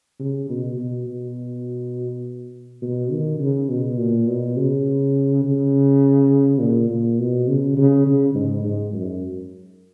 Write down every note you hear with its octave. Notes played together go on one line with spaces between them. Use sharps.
C#3
B2
B2
B2
B2
D#3
C#3
B2
A#2
B2
C#3
C#3
A#2
A#2
B2
C#3
C#3
C#3
G#2
G#2
F#2